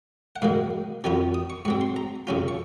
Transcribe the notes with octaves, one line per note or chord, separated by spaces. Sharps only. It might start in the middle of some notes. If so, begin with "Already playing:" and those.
F#5
G#2 D#3 F#3 A#3 F5
F2 D#3 F#3 C#4 F4
D#6
C#6
G#2 F#3 C4 C#6
C6
A#5
F#2 C#3 F#3 C#4 F4
C#6